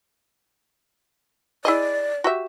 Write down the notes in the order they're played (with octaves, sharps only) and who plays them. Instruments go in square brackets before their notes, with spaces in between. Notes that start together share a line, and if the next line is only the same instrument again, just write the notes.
[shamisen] E4 G#4 D#5 [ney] D5
[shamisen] F#4 G4 E5